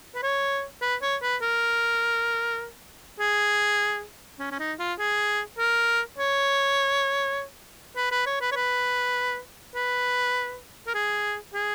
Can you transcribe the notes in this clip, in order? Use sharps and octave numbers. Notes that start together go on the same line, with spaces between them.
B4
C#5
B4
C#5
B4
A#4
G#4
C#4
C#4
D#4
F4
G#4
A#4
C#5
B4
B4
C#5
B4
C#5
B4
B4
A#4
G#4
G#4